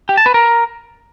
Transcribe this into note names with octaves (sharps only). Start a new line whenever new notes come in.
G4
A5
B4
A#4